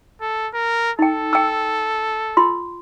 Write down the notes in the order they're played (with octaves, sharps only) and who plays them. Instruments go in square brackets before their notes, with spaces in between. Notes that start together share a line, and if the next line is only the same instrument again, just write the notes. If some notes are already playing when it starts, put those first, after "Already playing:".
[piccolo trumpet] A4
A#4
[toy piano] D#4 G5 [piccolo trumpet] A4
[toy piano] G5 E6
F4 C6